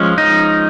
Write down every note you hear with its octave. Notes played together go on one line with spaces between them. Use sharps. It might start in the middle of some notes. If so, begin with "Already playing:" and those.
Already playing: F3 G#3 C#4
D#4